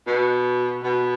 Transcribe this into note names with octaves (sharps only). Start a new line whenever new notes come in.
B2
B2